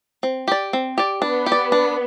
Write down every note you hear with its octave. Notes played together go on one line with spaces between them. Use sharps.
C4
G4 D5
C4
G4 D5
B3 D4
G4
D5
D4